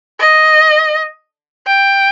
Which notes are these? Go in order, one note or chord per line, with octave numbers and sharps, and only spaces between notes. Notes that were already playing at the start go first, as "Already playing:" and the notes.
D#5
G5